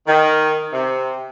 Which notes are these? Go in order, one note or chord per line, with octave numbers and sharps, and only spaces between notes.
D#3
C3